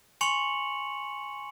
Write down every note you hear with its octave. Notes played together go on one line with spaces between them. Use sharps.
G#5 C6 C#6 C#7 F7 F#7